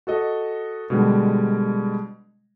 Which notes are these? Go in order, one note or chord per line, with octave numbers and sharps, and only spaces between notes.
F#4 A4 D#5
B2 D3 G3 G#3